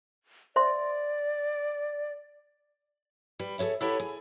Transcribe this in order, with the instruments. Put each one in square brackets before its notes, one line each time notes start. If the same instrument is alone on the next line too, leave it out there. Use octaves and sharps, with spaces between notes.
[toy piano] C5 E5 C6 [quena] D5
[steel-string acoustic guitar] G3 B4
G#4 A4 C5 C#5 E5
E4 G4 A4 B4 C#5 F#5
G#4